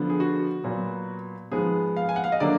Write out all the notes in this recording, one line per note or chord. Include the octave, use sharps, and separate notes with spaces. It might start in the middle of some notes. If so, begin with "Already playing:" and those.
Already playing: D3 F3 B3
G#4
F#4
A#2 F#3 B3
G#2 F3 G#3 B3 G#4
F5
G#5
F#5
F5
D#5
D3 F#3 A#3 D5